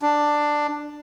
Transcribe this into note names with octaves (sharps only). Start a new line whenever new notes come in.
D4